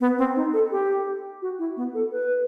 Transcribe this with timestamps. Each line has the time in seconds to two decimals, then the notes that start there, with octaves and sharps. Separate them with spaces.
0.01 B3
0.18 C4
0.36 D#4
0.53 A4
0.71 G4
1.42 F#4
1.59 E4
1.77 B3
1.94 A4
2.12 B4